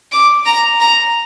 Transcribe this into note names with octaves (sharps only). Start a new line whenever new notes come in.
D6
A#5
A#5